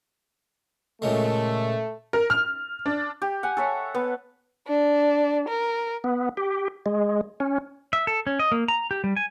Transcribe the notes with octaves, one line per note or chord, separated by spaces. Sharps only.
A#2 C#3 G#3 A3
A#4
F6
D4
G4
F#5 G#5
A4 C#5 E5
B3
D4
A#4
B3
G4
G#3
C#4
E5
A4
C#4
D#5
A#3
A#5
G4
G3
G#5